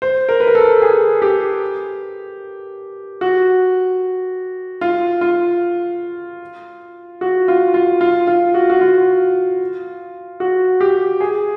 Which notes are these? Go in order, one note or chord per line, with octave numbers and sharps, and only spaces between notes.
C5
A#4
B4
A#4
A4
G#4
G4
F#4
F4
F4
F#4
F4
F4
F4
F4
F#4
F#4
F4
F#4
G4
G#4